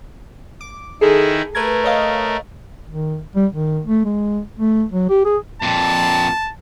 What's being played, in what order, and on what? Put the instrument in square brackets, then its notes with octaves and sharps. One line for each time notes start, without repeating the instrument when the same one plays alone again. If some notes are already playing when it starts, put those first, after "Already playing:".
[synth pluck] D6
[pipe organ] D#3 D#4 E4 [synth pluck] G#4 A4
[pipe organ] A3 A#4 [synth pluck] B4 G#6
[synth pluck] C#5 D#5 F5
[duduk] D#3
G3
D#3
A3
G#3
A3
F#3
G4
G#4
[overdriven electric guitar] F2 A#2 [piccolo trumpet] A5